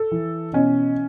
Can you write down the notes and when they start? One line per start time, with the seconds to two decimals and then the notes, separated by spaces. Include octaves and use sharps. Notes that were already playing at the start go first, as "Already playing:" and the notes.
Already playing: A4
0.11 E3
0.53 B2 C#4